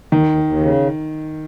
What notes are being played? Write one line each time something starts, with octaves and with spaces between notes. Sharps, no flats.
D#2 D#3
D#2
D#2
C#3